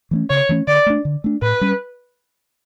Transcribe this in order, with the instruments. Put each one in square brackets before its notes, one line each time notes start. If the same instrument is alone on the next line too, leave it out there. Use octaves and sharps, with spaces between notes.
[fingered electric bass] E3 A3 C#4
[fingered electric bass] C#3 [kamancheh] C#5
[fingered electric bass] E3 A3 C#4
[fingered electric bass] D3 [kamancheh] D5
[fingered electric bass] A3 D4
D3
A3 D4
[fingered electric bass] A2 [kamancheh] B4
[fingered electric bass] G3 C#4